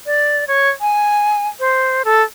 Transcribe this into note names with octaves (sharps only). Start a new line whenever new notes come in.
D5
C#5
G#5
C5
A4